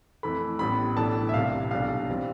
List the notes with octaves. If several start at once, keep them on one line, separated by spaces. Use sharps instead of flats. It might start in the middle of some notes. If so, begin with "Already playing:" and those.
F2 E3 A3 B5
A1 A2 G3 B3 B5
B1 A2 E3 A3 D4 A5
E5
C2 C3 G3 F5
B1 B2 G3 D4 F5
E3 G3 C4